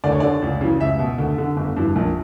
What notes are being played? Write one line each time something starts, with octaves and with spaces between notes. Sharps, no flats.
D2 D5
C#5
D3 D5
C#2
C#3 E3
C#2 E5
B2
D2
D3
G1
G2 E3
A#1